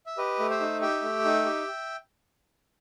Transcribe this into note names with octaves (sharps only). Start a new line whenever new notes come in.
E5
G4 B4 D#5
A3
C5 E5
D#4
G4 E5 G5
A3
D#4
G4